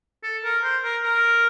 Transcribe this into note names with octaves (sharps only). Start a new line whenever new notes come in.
A4
A#4
C5
A#4
A#4